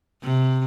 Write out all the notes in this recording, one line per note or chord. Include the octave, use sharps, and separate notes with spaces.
C3